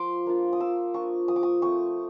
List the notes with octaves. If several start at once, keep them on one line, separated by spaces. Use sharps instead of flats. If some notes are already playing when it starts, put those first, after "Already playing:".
Already playing: F3 C6 D6
A#3 D4 F4
D#6
F3 D6 E6
A#3 D4 F4 C#6 D#6
F3 D#6
D6
C#6 D#6
A3 C4 C#6 D#6